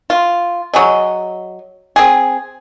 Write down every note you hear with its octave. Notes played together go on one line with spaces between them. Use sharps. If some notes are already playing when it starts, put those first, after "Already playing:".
F4
F#3 G#4 D#5
C4 G#4